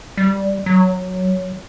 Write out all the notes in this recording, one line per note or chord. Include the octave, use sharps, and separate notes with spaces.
G3
F#3